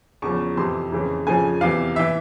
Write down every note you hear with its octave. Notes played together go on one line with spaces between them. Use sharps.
E2 C#3 F3 C#6
F2 C3 E3 C6
F2 C#3 E3
F2 C#3 F3 G#5
E2 C3 E3 F5
E3 E5